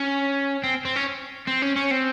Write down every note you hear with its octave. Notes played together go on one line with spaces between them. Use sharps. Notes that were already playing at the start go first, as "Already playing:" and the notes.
Already playing: C#4
C4
C4
C#4
C4
C#4
C#4
C4